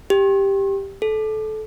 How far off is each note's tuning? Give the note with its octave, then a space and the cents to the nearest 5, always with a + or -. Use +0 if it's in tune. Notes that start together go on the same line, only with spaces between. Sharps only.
G4 +5
A4 -20